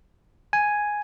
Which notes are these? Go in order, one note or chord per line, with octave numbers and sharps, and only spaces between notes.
G#5